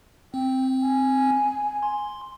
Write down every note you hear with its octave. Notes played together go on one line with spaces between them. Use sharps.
C4 G5
G#5
C6